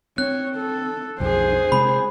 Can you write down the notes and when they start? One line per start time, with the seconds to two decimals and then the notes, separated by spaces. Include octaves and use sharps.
0.18 C4 C#5 F#6
0.56 A4
1.20 B1 F2 G#4 C5
1.72 C3 G#3 C4 B5